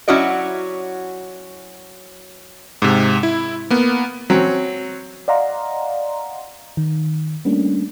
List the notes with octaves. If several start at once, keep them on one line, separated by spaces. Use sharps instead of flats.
F#3 C#4 E4 F#4 D5 D#5
G#2 C3
E4
A#3 B3
F#3 C4 C#4
D5 D#5 F5 F#5 A#5 C6
D#3
G3 A3 A#3 C#4 D4